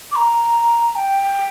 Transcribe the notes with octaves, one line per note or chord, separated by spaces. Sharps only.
D6
A#5
G5